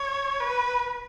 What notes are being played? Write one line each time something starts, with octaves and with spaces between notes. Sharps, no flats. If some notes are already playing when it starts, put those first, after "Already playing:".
Already playing: C#5
B4